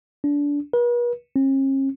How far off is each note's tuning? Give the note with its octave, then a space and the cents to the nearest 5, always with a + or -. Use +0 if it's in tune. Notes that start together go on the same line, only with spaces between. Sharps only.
D4 -25
B4 -45
C#4 -45